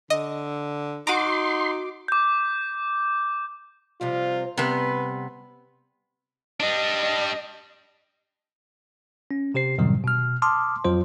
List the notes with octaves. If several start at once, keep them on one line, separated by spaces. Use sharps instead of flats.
D3 D#5
D#4 F#4 A#5 C6 D6 D#7
D6 G6
C3 F3 G3 F4
C3 G3 B3 B4
G3 D4 D#5
C#4
C3 G4 C5 C7
F#2 A2 C3 D#3 F#3 G3
B2 F6
A5 C6 D6 D#6 F6
F2 F#3 F4 C5